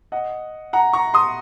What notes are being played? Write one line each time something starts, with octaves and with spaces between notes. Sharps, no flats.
D#5 F#5
F#5 A#5
A#5 C#6
C6 D#6